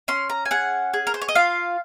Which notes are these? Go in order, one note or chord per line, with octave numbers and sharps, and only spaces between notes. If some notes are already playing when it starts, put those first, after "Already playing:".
C#4 C6
A#5
G#5
G#4 F#5
G#4
A#4
C5
C#5
D#5
F4 F5